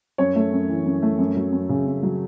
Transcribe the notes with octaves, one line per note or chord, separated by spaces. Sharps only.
F#2 C#5
A3
F#2
E3
F#2
A3
F#2
F#3
F#2
C#3
F#2
F#3